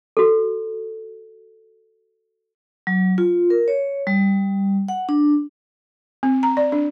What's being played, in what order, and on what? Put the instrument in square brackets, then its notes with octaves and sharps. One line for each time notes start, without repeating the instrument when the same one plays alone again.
[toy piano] F#4 A4
[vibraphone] F#3
F4
A#4
C#5
G3
F#5
D4
[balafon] C4
A#5
D5
D4